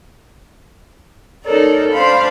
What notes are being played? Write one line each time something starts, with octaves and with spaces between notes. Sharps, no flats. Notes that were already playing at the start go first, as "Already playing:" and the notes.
D#4 A4 A#4 C#5 D5
D4 C5 F5 B5